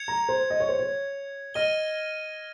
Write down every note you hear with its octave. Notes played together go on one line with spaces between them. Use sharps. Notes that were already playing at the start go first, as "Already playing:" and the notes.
Already playing: G#6 C#7 F7
A#5
C5
D#5
C#5
C5
C#5
D#5 F6 A#6 D#7 G7